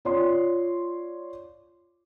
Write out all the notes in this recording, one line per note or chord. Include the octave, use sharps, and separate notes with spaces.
F4 C#5 D5 C6